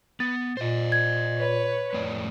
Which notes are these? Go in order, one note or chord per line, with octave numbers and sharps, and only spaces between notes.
B3 A6
A#2 C5 D#5
G#6
B4 C#5
F2 A2 D5